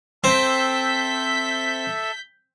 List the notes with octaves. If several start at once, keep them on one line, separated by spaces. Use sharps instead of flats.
C4 A4 E5 G6 B6